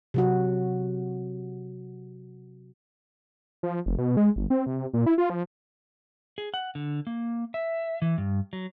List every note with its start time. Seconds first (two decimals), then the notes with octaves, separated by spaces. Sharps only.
0.14 C3 F#3 F#4
3.63 F3
3.86 F1
3.98 B2
4.17 G#3
4.36 G1
4.50 C4
4.66 C3
4.94 A#2
5.06 E4
5.18 F4
5.30 F3
6.38 G#4
6.54 F#5
6.75 D3
7.07 A#3
7.54 E5
8.02 E3
8.18 G2
8.53 F#3